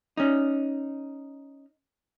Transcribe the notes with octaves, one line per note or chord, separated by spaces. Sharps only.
C#4 D#4